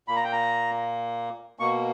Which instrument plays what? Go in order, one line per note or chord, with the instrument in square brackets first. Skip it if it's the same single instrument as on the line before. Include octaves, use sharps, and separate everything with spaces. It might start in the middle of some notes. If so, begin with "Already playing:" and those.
[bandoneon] A#2 A#3 B5
A#5
G5
A#5
B2 A#3 C#6